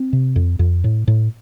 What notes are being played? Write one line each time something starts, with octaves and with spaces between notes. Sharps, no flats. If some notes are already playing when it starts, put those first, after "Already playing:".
Already playing: C4
C3
F2
F2
A2
A2